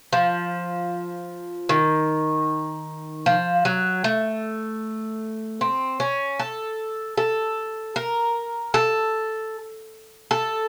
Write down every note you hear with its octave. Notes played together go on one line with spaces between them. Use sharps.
F3
D#3
F3
F#3
A3
C4
C#4
A4
A4
A#4
A4
A4